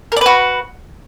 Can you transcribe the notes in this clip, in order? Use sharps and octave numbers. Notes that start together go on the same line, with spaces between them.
F#4 A#4 B4 D5